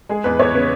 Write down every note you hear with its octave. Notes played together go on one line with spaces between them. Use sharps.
G#3 G#4
E2 B4
E2 C#5
C#3 B3